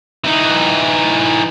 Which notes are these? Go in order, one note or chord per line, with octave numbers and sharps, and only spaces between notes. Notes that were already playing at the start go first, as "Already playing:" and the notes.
E3 D#4